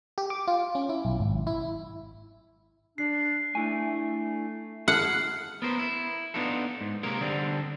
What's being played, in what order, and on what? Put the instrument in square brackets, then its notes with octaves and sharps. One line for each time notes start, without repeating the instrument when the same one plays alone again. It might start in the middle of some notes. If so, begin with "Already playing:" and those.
[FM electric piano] G4
D6
F4
C#4
E4
B1
G#1
E4
[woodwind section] D4 [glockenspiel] C7
[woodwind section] A3 [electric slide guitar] D4 E4 G#5
[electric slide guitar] E4 G#4 A5 [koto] F#5 [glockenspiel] F6 C7
[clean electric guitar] B3 A#4 C5
E4
B3 D4 D#4 F4 A4
G#2
C3 G#3 A#3 A#4
D3 G3 C4 D4